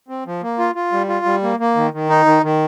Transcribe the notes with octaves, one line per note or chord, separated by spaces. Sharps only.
C4
F3
A#3
F4
F4
G3
F4
G3
A#3
A#3
D#3
D#3
D#4
D#3
D#3